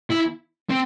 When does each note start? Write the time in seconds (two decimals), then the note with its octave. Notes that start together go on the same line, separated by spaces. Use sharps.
0.11 E4
0.70 C4